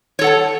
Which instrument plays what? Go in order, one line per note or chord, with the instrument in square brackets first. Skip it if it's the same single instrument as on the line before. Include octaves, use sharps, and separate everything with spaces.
[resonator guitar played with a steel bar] C#5
A4
F#5
A5